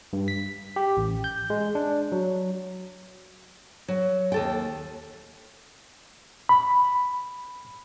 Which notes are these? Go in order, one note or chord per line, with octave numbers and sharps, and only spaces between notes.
G2
B6
G4
A1
G6
G#3
D4
F#3
F#3
D#2 A4 G5
B5